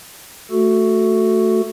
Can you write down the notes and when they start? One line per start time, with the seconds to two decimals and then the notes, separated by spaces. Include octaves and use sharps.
0.51 A3 F#4 A4